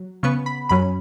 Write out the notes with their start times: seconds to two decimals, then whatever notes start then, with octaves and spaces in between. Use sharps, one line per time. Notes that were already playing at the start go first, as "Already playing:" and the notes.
Already playing: F#3
0.23 C#3 B3 C#6
0.46 B5
0.69 F#2 F#3 C#4 B5